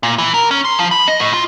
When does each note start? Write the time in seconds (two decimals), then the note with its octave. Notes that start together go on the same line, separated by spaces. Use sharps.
0.03 A#2
0.18 E3
0.34 A#4
0.51 C#4
0.65 C6
0.79 F3
0.91 B5
1.08 D#5
1.20 A2
1.34 F4